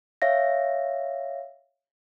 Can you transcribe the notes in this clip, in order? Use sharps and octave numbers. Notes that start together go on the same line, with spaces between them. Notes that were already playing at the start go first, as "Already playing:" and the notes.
C#5 E5 F5 A#6